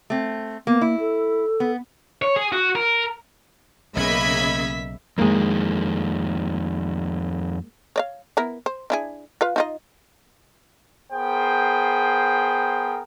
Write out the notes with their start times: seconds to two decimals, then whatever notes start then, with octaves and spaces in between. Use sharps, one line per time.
0.10 A3 C4
0.67 A#3 B3
0.81 A#3 E4
1.00 A4
1.60 B3
2.22 C#5
2.36 G#4
2.52 F#4
2.75 A#4
3.97 B1 C#3 A#3 D#5 E5 B5 G#6 B6
5.18 F2 D#3 G#3 A#3
7.96 C#5 D5 F5
8.37 B3 E4 A#4
8.66 C5
8.90 D4 E4 G#4
9.41 F4 B4 F5
9.56 D#4 F4 D#5
11.13 B3 G#4 A#4 C5 G5